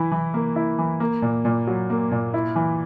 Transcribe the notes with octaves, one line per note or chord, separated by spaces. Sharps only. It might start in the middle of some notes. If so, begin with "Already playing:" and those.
Already playing: E3 E4
E3
A#3
E4
E3
A#3
A#2
A#2
F#3
A#3
A#2
E4
E3